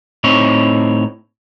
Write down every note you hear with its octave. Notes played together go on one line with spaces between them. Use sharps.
A2 C4 D#4 C#5